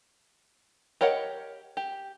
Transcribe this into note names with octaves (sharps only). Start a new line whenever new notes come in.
G4 A#4 C#5 D#5 F#5
G4